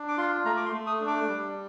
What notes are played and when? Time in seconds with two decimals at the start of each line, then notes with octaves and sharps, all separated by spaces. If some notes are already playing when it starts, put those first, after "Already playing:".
Already playing: D4
0.08 D6
0.18 F4 C6
0.45 A3 A#5
0.57 D6
0.66 C6
0.73 A3
0.87 D#6
1.01 D4
1.07 D6
1.28 G3